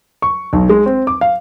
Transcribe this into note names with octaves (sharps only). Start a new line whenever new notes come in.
C#6
B1
G#3
C4
D6
F5